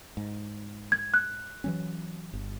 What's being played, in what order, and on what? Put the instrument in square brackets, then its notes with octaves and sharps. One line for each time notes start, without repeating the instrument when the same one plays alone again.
[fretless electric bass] G#2
[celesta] G#6
F#6
[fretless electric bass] E3 F#3 C#4
G1